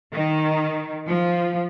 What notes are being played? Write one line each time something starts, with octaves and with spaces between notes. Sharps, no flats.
D#3
F3